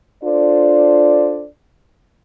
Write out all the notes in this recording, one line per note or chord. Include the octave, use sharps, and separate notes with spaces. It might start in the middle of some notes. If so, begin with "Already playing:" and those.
D4 F4 A4 C5 D5